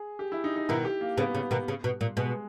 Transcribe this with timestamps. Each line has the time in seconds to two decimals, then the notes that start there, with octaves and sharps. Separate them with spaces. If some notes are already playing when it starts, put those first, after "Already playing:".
Already playing: G#4
0.19 G4
0.32 E4
0.44 D#4
0.56 D#4
0.69 B2 D#3 E4
0.85 G4
1.01 A#3
1.18 C#3 B3
1.35 C#3
1.51 B2 D#3
1.68 C#3
1.84 B2
2.01 A#2
2.17 B2 G#3